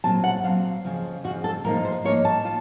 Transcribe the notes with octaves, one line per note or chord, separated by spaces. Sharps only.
A#2 F#3 C4 A5
F#5
A#2 F#3 C4 F5
F2 C#3 F3
F2 C#3 F3 F#4
A4
A2 F3 A#3 D#4 A#4
C5
A2 F3 A#3 D#4 C#5
A5
F4